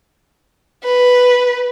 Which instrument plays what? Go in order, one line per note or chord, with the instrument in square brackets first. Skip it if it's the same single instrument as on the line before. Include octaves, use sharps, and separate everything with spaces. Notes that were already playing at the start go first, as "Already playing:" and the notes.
[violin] B4